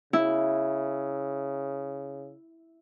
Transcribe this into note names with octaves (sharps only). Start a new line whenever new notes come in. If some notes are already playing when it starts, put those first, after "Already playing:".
C#3 E4